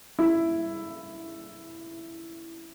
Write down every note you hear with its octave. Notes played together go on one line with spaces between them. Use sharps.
E4